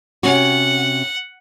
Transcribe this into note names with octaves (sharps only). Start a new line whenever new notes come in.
C3 C#4 F#4 F#5